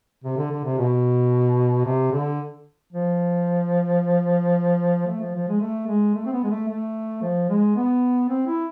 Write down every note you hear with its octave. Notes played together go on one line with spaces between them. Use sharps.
C3
D3
D3
C3
B2
C3
D3
F3
A3
F3
F3
G#3
A3
G#3
A3
C4
B3
G#3
A3
A3
F3
G#3
B3
C4
E4